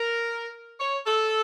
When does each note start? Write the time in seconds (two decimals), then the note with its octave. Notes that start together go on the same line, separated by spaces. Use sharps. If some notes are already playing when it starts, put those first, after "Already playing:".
Already playing: A#4
0.80 C#5
1.06 A4